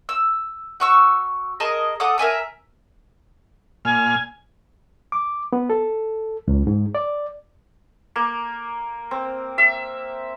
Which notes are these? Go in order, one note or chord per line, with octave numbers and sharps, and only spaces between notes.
E6
F#4 C#6 E6
G#4 A#4 D#5 A5
A4 F#5 D6 D#6
A#4 E5 G#5 A#5
A#2 G#5 F6
D6
B3
A4
C#2
G#2
D5
A#3
C4
E5